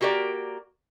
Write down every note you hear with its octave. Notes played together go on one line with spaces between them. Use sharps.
A#3 F#4 G4 A#4 D5